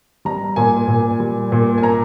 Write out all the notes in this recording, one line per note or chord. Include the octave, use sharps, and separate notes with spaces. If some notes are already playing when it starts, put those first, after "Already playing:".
G3 A#5
A#2 G#5
A#2
G3
A#2
G#5
A#3 A#5